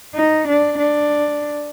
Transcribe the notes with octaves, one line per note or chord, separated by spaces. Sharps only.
D#4
D4
D4